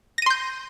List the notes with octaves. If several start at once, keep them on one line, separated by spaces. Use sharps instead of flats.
C6 G6 A#6 D#7